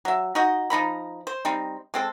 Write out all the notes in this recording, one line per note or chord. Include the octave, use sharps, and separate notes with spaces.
F#3 E5
D#4 F#4 D#5
F3 D#4 A#5 B5
C5
G3 C4 D#4
G#3 C4 A4